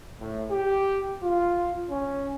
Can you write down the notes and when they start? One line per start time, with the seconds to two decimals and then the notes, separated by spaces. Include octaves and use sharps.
0.20 A2
0.51 G4
1.22 F4
1.89 C#4